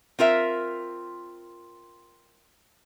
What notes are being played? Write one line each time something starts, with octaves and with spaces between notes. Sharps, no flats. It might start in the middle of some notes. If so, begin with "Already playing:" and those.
C4 F4 A#4 E5